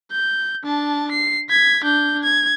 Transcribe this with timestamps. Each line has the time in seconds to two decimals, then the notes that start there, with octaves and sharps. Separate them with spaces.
0.12 G6
0.64 D4 A5
1.12 C7
1.50 G#6 B6
1.84 D4 G6
2.24 G#6